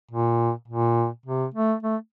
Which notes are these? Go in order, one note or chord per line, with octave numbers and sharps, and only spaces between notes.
A#2
A#2
C3
A3
A3